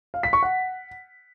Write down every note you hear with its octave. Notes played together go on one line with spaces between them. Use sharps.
F5
B6
C#6
F#5